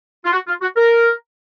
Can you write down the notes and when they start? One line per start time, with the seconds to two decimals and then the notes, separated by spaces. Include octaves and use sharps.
0.24 F4
0.32 F#4
0.47 F4
0.61 F#4
0.76 A#4